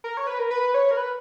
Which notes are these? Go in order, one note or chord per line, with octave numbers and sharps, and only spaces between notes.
A#4
C#5
B4
A#4
B4
C#5
A#4
B4